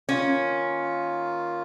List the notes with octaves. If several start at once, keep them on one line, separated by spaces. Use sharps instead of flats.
D#3 A#3 C#4 F4